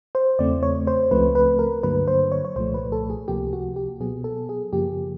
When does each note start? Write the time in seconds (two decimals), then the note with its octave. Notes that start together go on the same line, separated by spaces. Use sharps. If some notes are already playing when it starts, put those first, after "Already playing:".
0.15 C5
0.39 E2 C#3 E3 A3 C4 D5
0.63 C#5
0.87 C5
1.11 C#2 C#3 F3 A3 C4 B4
1.35 B4
1.59 A#4
1.83 G2 D3 F#3 A#3 B4
2.07 C5
2.32 C#5
2.45 C#5
2.56 C2 A#2 F3 A3 C5
2.74 B4
2.92 A4
3.10 G#4
3.28 C#2 C3 F3 A#3 G4
3.53 F#4
3.76 G4
4.00 B2 F#3 B3 G#4
4.24 A4
4.49 G#4
4.73 F#2 C#3 F3 A#3 G4